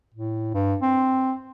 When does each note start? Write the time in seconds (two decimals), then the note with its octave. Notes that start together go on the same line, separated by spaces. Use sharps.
0.14 A2
0.54 G2
0.82 C4